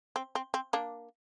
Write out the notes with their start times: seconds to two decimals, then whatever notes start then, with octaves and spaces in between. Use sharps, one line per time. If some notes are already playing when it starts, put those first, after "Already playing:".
0.16 C4
0.35 C4
0.54 C4
0.73 A#3 D4